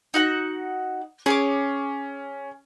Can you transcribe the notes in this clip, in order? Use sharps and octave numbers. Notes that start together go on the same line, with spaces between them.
D#4 F#4 F#5
C#4 G#4 C#5 D6